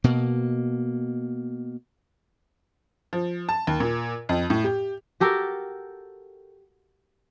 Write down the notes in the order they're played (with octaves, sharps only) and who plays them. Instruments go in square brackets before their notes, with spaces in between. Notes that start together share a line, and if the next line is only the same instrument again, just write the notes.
[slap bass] B2 A#3
[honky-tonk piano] F3
A5
D#2
A#2
F2
A2
G4
[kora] F#4 G4 A4 A#4